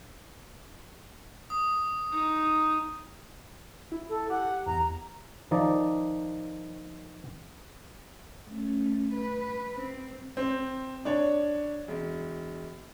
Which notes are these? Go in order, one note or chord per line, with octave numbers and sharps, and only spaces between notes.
D#6
D#4
E4
A4
G4 F#5
E2 E3 A#5
D#3 F3 D#4 D5
A3 C#4
B4
C4
C4
D4 C#5
E1